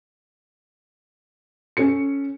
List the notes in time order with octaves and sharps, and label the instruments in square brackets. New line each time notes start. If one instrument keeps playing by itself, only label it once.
[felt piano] C#4 A4 C#7